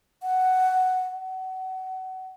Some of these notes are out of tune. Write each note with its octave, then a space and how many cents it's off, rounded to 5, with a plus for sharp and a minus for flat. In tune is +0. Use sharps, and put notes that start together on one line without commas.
F#5 +5
F#5 +25